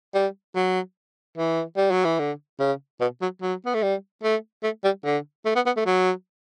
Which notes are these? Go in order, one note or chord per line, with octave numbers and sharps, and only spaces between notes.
G3
F#3
E3
G3
F#3
E3
D3
C#3
B2
F#3
F#3
B3
A3
G3
A3
A3
G3
D3
A3
B3
B3
A3
F#3